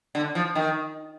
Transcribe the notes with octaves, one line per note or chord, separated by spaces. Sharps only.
D3
F3
D#3